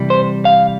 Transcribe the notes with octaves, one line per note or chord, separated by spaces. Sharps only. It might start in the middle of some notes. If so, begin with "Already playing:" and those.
Already playing: C3 E3 G3
C5
F5